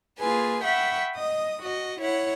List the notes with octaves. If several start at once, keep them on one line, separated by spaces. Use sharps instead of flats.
A#3 F4 G#4 B4 G#5
E5 F#5 G5 B5 C#6
D#5 D#6
F#4 D#5
E4 C#5 F#5